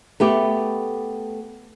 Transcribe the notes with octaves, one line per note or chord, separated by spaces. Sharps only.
A3 B3 G4